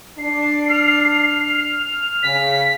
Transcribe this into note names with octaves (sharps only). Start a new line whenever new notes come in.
D4 C7
F6
C#3 B6